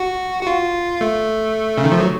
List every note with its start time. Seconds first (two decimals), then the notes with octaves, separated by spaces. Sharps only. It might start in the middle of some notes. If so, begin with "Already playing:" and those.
Already playing: F#4
0.43 F#4
0.47 F4
1.01 A3
1.78 C#3
1.84 D#3
1.92 F3
2.00 F#3